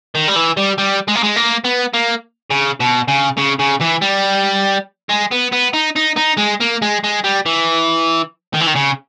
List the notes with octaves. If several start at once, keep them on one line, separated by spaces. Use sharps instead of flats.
D#3
G3
E3
G3
G3
G#3
A#3
G#3
A#3
B3
A#3
C#3
B2
C#3
C#3
C#3
E3
G3
G#3
B3
B3
D#4
D#4
D#4
G#3
A#3
G#3
G#3
G3
E3
D#3
E3
D#3
C#3